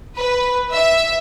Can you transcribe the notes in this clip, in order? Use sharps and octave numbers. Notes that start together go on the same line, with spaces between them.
B4
E5